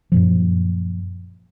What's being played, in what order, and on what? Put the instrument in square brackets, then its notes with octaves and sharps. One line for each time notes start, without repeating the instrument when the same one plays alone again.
[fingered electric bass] F#2 A#2 F3